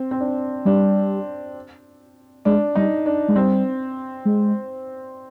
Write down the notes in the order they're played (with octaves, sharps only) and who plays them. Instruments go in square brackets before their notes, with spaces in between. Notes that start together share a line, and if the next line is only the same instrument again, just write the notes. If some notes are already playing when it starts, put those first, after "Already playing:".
Already playing: [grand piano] C4
C4
D4
[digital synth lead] G3 [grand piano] D4
[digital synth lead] G#3 [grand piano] D4
[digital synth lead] G3 [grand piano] D#4
[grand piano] D4
[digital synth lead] G#3
[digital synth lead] G3 [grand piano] C4
[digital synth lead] G#3